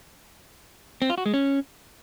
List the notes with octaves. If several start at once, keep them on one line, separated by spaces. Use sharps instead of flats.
C4
F4
F#4
G#3
C#4